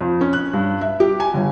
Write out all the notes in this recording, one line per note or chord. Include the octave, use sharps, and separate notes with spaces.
F2
C#4
F#6
G2
E5
G4
G#5
G1